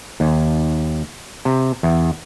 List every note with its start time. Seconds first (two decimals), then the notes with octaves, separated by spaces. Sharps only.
0.20 D#2
1.45 C3
1.83 E2